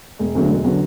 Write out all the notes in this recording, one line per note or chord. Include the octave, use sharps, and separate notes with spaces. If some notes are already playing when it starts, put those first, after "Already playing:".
E1
D2 D3 F#3 B3
E1
D3 F#3 B3